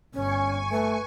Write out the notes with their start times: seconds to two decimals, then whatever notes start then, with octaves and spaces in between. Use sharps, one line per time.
0.14 G1 G2 C#4 G#5 C#6
0.71 A3 B4